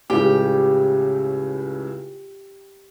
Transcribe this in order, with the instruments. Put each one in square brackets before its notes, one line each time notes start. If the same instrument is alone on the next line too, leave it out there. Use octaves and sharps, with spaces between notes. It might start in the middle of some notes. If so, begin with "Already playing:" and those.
[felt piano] C#2 A2 C#3 [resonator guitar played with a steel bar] G4